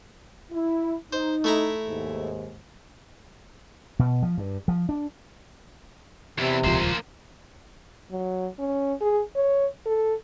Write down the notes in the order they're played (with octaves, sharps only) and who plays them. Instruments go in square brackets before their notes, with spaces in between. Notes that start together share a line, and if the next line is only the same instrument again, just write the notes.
[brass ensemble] E4
[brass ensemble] D#4 [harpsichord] C5
[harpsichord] A3 E4 A#5
[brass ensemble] D#2 G#2
[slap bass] B2
F3
G2
F3
D4
[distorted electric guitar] E2 E3 [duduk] C3
[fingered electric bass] D#1 C#2 F3 [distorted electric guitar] A#3 C5
[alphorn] F#3
C#4
G#4
C#5
A4